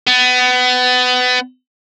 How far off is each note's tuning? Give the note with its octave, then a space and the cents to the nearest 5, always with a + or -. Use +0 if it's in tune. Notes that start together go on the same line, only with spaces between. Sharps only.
B3 +25